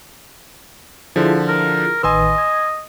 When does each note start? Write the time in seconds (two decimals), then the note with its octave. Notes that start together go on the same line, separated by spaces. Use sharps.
1.16 D3 F3 E4 F4 G#4
1.48 A#4
2.03 A1 D#3 B4 D#5 G#5 C6 E6
2.38 G#6